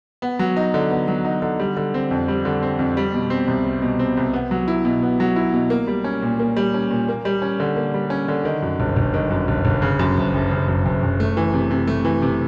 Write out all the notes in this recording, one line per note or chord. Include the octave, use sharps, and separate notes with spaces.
B3
F#3
D#4
D3
B3
F#3
D#4
D3
G3
D3
C4
F2
G3
D3
C4
F2
G3
B2
C4
C2
G3
B2
C4
C2
B3
F#3
E4
B2
B3
F#3
E4
B2
A#3
G3
C#4
A#2
A#3
G3
C#4
A#2
A#3
G3
C#4
D3
A#3
G3
C#4
D3
D#3
F#2
G1
G1
D#3
F#2
G1
G1
C#3
F#2
F#1
F#1
C#3
F#2
F#1
F#1
A3
E3
C3
C3
A3
E3
C3